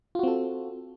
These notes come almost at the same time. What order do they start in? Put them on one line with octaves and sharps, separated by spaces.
F4 F#4 C4 A4